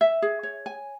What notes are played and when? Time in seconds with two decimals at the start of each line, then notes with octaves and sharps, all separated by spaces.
0.01 E5
0.22 G#4
0.43 C#5
0.66 G#5